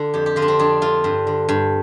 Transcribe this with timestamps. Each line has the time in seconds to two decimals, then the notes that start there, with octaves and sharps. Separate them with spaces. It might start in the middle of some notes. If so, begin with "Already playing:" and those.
Already playing: D3 D4 F4
0.14 F2 G4
0.26 G4
0.36 D3 F4
0.42 D4
0.48 C4
0.59 F2 D4
0.82 D3 F4
1.04 G2
1.27 D3
1.49 G2